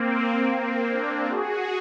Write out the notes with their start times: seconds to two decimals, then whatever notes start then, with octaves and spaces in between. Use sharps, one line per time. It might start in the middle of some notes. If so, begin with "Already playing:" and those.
Already playing: A#3 C4
0.50 A#3 C4
0.90 C4 D4
1.30 F#4 G#4